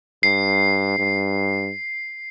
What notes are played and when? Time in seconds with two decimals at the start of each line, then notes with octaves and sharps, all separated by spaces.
0.23 G2 C7
0.98 G2